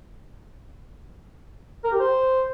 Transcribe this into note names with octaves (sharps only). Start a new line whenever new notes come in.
A#4
G4
C5